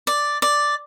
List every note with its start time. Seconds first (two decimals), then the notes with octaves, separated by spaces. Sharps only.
0.07 D5
0.42 D5